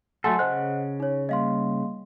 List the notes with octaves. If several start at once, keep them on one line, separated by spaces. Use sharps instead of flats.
F#3 A3 A4 F#5 G#5 C6
C#3 C5 D#5 F#5 F#6
D#4 C#5
G3 A#3 D#5 F5 C6